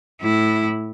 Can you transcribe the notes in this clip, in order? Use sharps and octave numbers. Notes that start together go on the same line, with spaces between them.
A2 E4